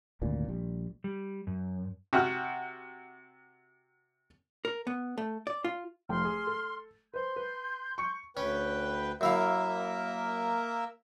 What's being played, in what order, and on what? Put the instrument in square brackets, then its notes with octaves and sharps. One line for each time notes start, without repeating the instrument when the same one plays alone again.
[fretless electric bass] G#1 D2 A#2
A#1 G3
[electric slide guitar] G3
F#2
[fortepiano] C3 F#4 F#5 F6
[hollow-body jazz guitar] A#4
B3
A3
D5
F4
[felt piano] F1 F3 G5 [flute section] C6 F6
[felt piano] G#4
A4
[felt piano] B4 C5 [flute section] C6 G6
[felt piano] B4
C#6 C#7
[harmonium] D2 B4 G5 [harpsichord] C#4
[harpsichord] F#2 E4 F5 [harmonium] A#3 A#4 E5